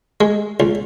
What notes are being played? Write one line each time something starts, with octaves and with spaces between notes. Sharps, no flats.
G#3
C#2